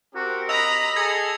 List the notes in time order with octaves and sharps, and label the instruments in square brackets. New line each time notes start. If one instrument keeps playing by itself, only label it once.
[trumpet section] C4 G4 A#4 [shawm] F#4
[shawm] D#5 [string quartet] A#5 B5 [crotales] E6 F7
[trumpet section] G#4 A4 [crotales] G#6 A#6 C#7